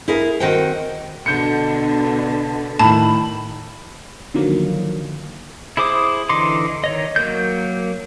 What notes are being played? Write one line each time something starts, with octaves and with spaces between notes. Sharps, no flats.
E4 G#4 A#4
D#3 C4 F#4 C5 G5
B2 D3 D4 G6 C#7
A2 D#3 A5 B5
D3 D#3 F3 F#3 A#3
E4 G#4 C5 D6 D#6
D3 E3 D#4 C6 D6
D#3 C#5 D#5
F#3 A#3 A#4 G6